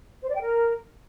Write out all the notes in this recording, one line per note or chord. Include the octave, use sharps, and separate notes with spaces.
C5
D5
G5
A#4